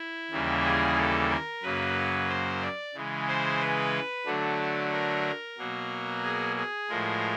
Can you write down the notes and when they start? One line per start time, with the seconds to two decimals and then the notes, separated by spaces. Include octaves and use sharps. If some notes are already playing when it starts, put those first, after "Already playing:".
Already playing: E4
0.31 D#2 C#3 E3 G3 A#3
0.64 G#4
0.97 A4
1.30 A#4
1.62 F#2 C#3 F#3 A#3 B4
2.28 C5
2.61 D5
2.95 C#3 E3 G#3
3.27 C5
3.61 B4
4.26 D3 F#3 A3 D4
4.92 A#4
5.58 B2 F#3 A#3
6.23 G#4
6.56 G#4
6.89 A2 F3 G#3 A#4